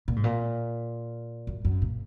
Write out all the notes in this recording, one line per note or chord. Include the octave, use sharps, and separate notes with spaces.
A#2
G#2
A#2
F#2
F#2
A#2